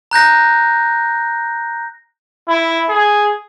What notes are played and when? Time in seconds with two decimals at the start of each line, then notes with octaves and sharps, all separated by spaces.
0.11 A#5 F#6 G6 A#6
2.48 E4
2.89 G#4